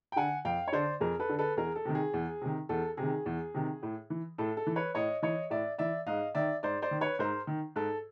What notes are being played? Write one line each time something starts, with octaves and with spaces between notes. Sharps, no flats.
G5
D3 F#5 G#5
F2 F5 G5
C#5
D3 C5 D5
F2 G#4 A#4
A4 B4
D3
A4 B4
E2 G#4 A#4
A4
C3 D#3
G#4
E2
C3 D#3
E2 A4
C3 G#4
D#3
E2
C3 D#3
A2
E3
A2 A4
A4
E3
B4 C#5
A2 C#5 D#5
E3 C#5 D#5
A2 D5 E5
E3 D5 E5
G#2 D#5 F5
D#3 D5 E5
G#2 C5 D5
C5 D5
D#3
B4 C#5
G#2 A#4 C5
D#3
G#2 A4